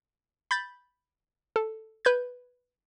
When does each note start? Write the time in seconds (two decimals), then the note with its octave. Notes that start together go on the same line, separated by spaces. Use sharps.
0.51 B5 G6 A6
1.56 A4
2.05 B4 G6 G#6